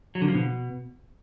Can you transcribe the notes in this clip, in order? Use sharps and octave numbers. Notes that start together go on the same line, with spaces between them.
F#3
D3
F3
B2